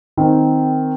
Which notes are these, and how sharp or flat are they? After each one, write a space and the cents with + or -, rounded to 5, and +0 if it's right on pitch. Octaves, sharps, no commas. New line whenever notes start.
D#3 +0 C4 -10